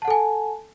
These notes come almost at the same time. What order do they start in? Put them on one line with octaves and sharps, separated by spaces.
A5 F#5 A4 G#5